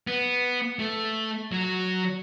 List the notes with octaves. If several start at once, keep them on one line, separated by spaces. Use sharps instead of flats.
B3
A3
F#3